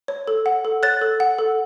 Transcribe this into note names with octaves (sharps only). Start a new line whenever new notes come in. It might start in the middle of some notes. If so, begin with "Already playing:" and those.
C#5
A4
F#5
A4
C#5 F#6 A6
A4
F#5
A4